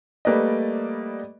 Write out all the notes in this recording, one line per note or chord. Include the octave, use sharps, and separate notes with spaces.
G3 A3 A#3 B4 D5 D#5